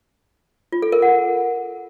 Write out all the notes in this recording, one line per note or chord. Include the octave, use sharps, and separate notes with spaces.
F4
A4
A#4
F#5